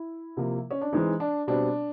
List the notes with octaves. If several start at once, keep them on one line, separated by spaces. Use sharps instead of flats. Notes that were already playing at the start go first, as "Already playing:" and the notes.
Already playing: E4
C3 F3 A#3
C#4
D4
E3 G#3 C4 D#4
D4
B2 G3 C4 D4